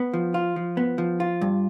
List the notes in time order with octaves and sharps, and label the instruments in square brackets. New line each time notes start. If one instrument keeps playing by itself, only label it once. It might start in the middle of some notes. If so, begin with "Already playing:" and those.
Already playing: [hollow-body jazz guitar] B3
F3
F4
F3
B3
F3
F4
G2